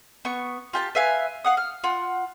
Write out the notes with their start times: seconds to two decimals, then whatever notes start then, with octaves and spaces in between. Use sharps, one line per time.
0.25 B3 C#6
0.73 F4 G4 A5
0.95 B4 E5 F5 G#5
1.44 F5 F#5 D#6
1.57 F6
1.84 F4 F#5